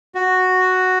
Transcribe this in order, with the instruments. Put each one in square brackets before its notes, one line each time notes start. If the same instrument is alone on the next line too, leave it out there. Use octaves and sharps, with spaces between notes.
[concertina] F#4